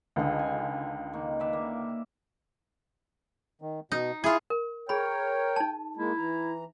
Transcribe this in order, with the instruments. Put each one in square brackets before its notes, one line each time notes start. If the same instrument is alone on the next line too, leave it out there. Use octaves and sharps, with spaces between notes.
[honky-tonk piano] C#2 D3 [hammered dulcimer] D#3 G#4
[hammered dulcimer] G#5
D#3 A#3
B4 D5 E5
A#3
[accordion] D#3
[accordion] B2 [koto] D#4
[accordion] E4 D#6 [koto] F4 G#4
[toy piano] A#4
[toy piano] G#4 B5 [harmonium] A#4 C#5 [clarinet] G5
[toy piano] D#4 A5
[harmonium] G#3 A#3 [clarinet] E4
[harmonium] E3 A#5